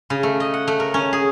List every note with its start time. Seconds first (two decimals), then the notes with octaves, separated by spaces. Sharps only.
0.10 C#3
0.23 A3
0.40 D#5
0.54 F#5
0.67 A3
0.80 A#4
0.94 C#4
1.13 G#4